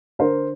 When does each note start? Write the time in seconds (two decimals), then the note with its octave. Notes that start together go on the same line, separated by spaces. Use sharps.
0.19 D3 A#4 C5